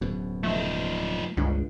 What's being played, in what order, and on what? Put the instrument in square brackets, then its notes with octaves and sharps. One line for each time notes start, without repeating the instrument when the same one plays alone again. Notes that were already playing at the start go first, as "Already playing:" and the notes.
[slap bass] D1 F#2 B2
[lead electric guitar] F3 D#4 [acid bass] A3
[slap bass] G1 C3 D4 [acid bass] C#2